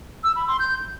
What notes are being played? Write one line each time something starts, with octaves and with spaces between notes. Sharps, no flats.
E6
B5
C6
G6